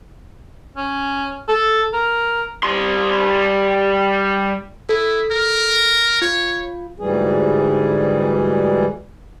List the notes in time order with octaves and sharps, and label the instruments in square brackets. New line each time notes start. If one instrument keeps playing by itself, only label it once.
[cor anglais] C#4
A4
A#4
[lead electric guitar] G3 C6
[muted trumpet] E4 [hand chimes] A4
[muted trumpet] A#4
[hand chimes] F4 [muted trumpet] C#5
[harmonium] D2 G#2 E3 G3 G#4